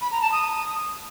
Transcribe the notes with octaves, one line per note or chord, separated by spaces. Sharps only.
B5
A#5
A5
D#6